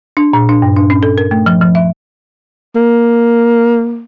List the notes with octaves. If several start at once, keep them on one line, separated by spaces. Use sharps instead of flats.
D4
A#2
D4
G2
D4
C#4
A4
A#4
A3
F3
F3
E5
A#3